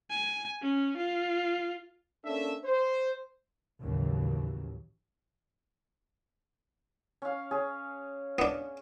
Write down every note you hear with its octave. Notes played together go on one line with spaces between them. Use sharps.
G#5
C#4
F4
A#3 C#4 D4 A4 E5
C5
A1 D#2 C#3 E3 F#3
C#4 F5
C#4 G#4
B3 D4